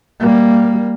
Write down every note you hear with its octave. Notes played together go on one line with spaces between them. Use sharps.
G3 A#3